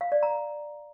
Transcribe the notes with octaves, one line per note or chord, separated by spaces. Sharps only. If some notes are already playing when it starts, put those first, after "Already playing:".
F5
D5
A#5